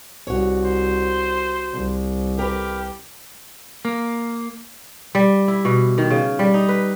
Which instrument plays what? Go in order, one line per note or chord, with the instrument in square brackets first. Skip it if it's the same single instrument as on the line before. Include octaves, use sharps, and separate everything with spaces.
[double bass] C2 [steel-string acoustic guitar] F#4 C#5
[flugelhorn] C5
[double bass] C2
[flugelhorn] G4 [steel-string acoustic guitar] A#4 B4
[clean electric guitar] A#3
[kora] G3
E4
B2
D#3
C#3
G3
D#4
B4